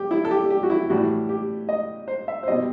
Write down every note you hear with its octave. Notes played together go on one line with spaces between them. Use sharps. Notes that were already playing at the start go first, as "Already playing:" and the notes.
Already playing: G4
E4
A4
G4
G4
F#4
E4
A2 E3 G3 F#4
G4
D#5
C5
E5
C5
B2 G3 C4 D#5